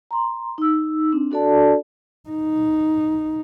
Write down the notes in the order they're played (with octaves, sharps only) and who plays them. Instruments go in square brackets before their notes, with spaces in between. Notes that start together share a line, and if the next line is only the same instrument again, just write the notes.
[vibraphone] A#5 C6
D#4 E6
C4 D4
D4 F#4 A4 D5 A5
[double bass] D#4